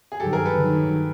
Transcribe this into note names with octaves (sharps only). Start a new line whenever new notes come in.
G#4
G2 D#3 F#3 G4 A4
G#4 A#4
A4 B4
G2 D#3 F#3